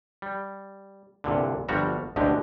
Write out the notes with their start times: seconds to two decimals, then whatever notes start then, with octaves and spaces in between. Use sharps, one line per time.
0.22 G3
1.24 C2 G2 A#2 D3
1.69 G1 F3 G3 F#4 A#5
2.16 A1 D2 B2 D3 G#3 G4